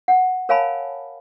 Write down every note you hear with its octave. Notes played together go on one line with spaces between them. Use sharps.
F#5
A#4 C#5 F5 G#5 A5 B5